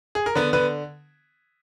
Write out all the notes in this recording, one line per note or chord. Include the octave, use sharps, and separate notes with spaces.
G#4
A#4
D3 B3 B4
D3 B3 B4